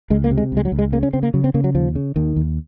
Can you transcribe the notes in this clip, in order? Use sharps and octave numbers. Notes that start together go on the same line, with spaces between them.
C#2 G#3
A#3
C3
G#3
C#2 G#3
F#3
C#2
G#3
C#3 A#3
C#4
C#3 C4
A#3
C#3 F#3
C4
C#3 A#3
F#3
D#2 F3
C#3
D#2 D#3
D#2